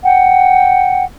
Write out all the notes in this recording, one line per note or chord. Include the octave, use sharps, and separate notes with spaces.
F#5 G5